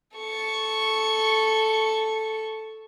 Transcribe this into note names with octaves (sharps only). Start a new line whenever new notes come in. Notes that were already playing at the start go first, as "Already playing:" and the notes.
A4 C#6